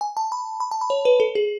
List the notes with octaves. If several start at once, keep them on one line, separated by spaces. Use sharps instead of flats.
G#5
A5
B5
B5
A5
B5
C#5
B4
A4
G#4